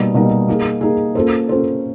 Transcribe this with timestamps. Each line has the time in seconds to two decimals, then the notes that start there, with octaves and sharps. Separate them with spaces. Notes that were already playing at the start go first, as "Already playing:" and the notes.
Already playing: B2 G3 A#3 D#4
0.14 B2 G3 A#3 D#4
0.48 A#3 D#4 G#4
0.81 A#3 D#4 G#4
1.15 A#3 C#4 F4 A4 C5
1.49 A#3 C#4 F4 A4 C5